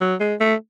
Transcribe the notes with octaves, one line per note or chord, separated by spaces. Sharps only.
F#3
G#3
A3